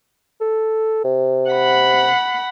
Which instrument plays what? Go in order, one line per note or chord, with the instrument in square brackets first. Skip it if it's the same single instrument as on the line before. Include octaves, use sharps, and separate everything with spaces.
[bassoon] A4
C3
[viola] F#5 B5